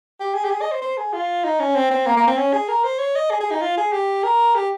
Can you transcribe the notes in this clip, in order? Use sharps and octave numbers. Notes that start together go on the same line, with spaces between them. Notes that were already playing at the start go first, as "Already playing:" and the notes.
G4
G#4
G4
G#4
D#5
C5
C5
G#4
F4
D#4
C#4
C4
C4
A#3
A#3
C4
C#4
G#4
A#4
C5
C#5
D#5
G#4
G#4
D#4
F4
G#4
G4
A#4
G4